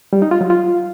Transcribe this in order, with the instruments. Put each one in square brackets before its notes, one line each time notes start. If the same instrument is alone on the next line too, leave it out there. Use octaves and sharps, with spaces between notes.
[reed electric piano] G3
D#4
F4
F#3
F4